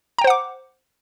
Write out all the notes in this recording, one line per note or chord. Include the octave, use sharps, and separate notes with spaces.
C5 F#5 G5 A#5 D6